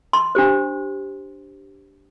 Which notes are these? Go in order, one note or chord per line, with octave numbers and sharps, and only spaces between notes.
C6
D4 G4 C5